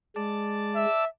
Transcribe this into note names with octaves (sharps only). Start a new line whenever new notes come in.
G#3 D5 A5
E5 E6